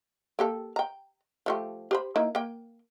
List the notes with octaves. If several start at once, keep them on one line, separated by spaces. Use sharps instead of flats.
A#3 G4 A4
G5 A#5
F3 A3 G4
G4 C5 B5
A#3 D#4 E4
A#3 G5